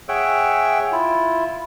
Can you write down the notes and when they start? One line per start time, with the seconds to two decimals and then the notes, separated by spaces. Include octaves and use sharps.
0.09 G#4 C#5 E5 F#5 G5 E6
0.92 E4 F4